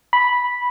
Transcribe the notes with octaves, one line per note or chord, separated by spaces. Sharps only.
B5